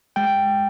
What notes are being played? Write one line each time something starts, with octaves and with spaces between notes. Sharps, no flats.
G#3 G5